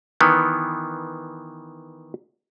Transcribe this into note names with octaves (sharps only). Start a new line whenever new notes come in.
D#3 E3 B3